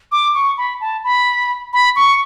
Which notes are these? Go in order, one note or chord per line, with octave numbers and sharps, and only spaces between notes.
D6
C#6
B5
A5
B5
B5
C#6